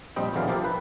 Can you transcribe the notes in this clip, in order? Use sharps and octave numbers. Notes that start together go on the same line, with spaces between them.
A#1 G3 C4 D#5 G5
B1 E2 D3 E3 F#3 F5
F3 A#3 G4 A4
B4